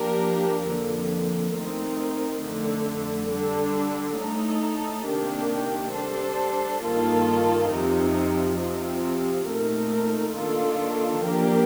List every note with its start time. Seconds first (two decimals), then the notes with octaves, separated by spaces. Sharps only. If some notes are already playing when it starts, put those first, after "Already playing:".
Already playing: F3 A#3 D4 G4 A#4
0.65 F2 D3 F3 A#3
1.54 D#3 A3 C4 D#4
2.42 F2 D3 A3
3.29 D3 G3 D4
4.18 A2 A3 D#4 A4
5.06 C3 D#3 A#3 D4 G4
5.94 G3 D4 A4 C5
6.82 G2 D#3 A#3 F4 A4
7.71 F2 C3 F3 C4 D#4
8.59 C3 F3 C4
9.47 A#2 A3 C4 D#4 A#4
10.35 D#3 A#3 D4 F4 A4
11.23 F3 A#3 D4 G4 A#4